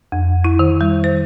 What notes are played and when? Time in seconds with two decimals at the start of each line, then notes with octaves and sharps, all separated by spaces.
0.12 F2
0.44 E4
0.59 D#3
0.81 G3
1.04 C5